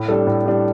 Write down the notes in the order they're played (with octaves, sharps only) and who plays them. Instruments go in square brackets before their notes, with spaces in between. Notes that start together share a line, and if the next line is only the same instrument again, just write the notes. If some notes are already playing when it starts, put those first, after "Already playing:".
Already playing: [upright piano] A2
G3 D4 A4
A2
G3 D4